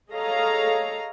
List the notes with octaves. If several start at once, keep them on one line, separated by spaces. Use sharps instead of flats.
G#4 A4 C#5 D#5 F5 A#5